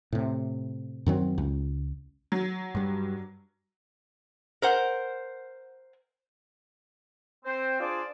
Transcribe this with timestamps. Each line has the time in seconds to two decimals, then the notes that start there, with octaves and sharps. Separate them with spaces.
0.12 A2 C3
1.06 F#2 D#3 F#3 C4
1.38 C#2
2.32 F#3
2.75 G2 G3
4.62 A#4 C5 F#5
7.45 C4 C5
7.80 D4 F4 G#4 C5 D5